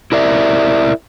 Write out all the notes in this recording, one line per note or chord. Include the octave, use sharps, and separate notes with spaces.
E4 A#4 D5 E5